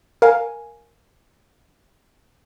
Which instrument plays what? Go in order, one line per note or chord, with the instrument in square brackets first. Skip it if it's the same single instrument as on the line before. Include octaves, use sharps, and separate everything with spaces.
[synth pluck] A#4 F5 G#5